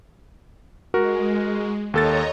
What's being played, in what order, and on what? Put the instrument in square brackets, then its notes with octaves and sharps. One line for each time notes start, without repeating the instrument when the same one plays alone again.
[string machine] G#3 [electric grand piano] F#4 A#4
[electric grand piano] D#2 A4 A6 [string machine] C#5 D#5 A#5